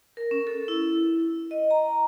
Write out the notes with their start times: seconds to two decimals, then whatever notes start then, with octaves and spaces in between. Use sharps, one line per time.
0.17 A#4
0.31 C#4
0.47 A4
0.68 E4
1.51 D#5
1.71 A#5